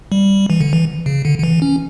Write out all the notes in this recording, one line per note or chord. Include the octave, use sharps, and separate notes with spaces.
G3
E3
D3
E3
C#3
D3
D3
E3
C#4